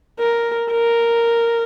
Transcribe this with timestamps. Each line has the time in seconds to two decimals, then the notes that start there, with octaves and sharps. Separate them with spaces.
0.19 A#4
0.71 A#4